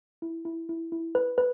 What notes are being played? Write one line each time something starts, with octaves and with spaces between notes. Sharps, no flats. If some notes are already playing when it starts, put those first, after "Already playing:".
E4
E4
E4
E4
B4
B4